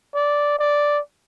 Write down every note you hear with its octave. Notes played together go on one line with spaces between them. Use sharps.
D5
D5